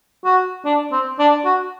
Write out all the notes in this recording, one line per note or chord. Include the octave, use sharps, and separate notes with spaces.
F#4
D4
C4
D4
F#4